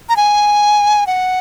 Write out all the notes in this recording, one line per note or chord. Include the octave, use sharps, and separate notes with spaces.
A#5
G#5
F#5